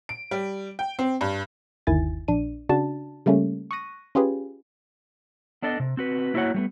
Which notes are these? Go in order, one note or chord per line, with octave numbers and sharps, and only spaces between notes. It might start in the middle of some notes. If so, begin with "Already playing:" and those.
D7
G3
G5
C4
G2
G1 D#2 D#3 E4 G#5 A6
A#1 D4 D#7
C#3 D4 F#4 A5
C#3 G3 A3 A#3 C#4
C#6 D#6 F#6 A#6 D#7
C#4 F4 G4 G#4 B4
B3 D4 A4 D5 D#5
C3
C4 F#4 B4
A#3 E4 F#4 A#4 C#5 F#5
G3 A3 B3